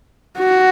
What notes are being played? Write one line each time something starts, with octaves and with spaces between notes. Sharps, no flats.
F#4